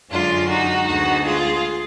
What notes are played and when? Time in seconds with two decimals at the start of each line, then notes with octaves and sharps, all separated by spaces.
0.11 F#2 D3 G#3 D4 F4
0.48 D#4 F#4
0.86 D2 D3 G#3 B3 D#4 F#4
1.24 F4 G#4